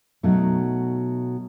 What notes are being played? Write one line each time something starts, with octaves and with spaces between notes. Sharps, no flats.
B2 F#3 A3 D#4